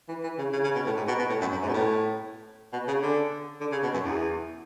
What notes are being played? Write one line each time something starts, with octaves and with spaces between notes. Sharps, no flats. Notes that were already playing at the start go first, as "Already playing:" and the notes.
E3
E3
C#3
C#3
C#3
B2
A2
G#2
B2
B2
A2
F#2
F#2
G#2
B2
A2
B2
C#3
D3
D3
C#3
B2
F#2
E2